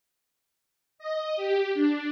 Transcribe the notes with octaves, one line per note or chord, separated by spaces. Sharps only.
D#5
G4
D4